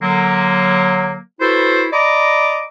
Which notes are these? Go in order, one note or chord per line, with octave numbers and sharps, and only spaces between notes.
D3 F#3 A#3
E4 F#4 A4 B4 C5
D5 D#5 A#5 B5 D6